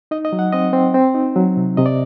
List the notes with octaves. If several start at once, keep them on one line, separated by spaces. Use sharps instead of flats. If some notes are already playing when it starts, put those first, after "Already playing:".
D#4 D#5
D#5
F#3
F#5
C4 D#5
C4
C4
D#4
F#3
C3
C3 D#5
D5